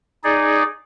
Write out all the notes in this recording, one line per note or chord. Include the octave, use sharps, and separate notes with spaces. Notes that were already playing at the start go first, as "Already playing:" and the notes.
D#4 G#4 D5